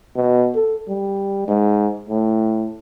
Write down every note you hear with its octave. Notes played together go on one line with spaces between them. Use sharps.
B2
A4
G3
G#2
A2